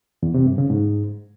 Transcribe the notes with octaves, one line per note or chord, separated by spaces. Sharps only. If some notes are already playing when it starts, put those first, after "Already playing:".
E2
C3
G2
C#3
G#2